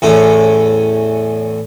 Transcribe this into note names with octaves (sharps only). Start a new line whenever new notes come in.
E2 A2 C#4